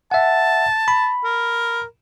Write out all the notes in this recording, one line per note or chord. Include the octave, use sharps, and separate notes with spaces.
E5 F#5 A5
B5
A#4